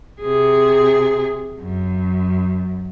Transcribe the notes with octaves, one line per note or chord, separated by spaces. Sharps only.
C3 G#4
F#2